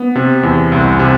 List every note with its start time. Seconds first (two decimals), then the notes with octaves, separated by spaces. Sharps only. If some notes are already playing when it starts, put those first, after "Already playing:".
Already playing: B3
0.15 C3
0.43 E2
0.72 C2
0.99 C3